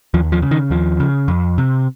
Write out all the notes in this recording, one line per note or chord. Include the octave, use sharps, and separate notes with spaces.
D#2 F3
F3
C#3
D#3
D#2 F3
C#3
F2
C3